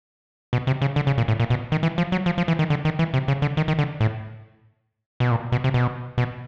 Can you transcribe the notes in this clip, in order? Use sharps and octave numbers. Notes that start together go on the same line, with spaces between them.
B2
C3
C#3
D3
C#3
A#2
A2
A#2
B2
D#3
E3
F3
F#3
F3
F3
E3
D#3
D3
D#3
E3
C3
C#3
D3
D#3
D#3
D3
A2
B2
A#2
B2
C3
B2
B2